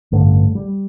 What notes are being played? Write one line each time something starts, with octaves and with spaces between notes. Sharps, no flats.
A1 G2 D3 A3
G3